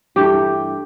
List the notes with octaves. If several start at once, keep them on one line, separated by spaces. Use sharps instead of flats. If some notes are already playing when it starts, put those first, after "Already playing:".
G2 E3 A3 G4